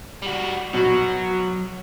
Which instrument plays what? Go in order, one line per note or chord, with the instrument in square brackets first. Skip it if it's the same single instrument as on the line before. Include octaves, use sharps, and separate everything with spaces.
[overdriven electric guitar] G3 F#4
[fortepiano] B2 F#4 [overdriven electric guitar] F#3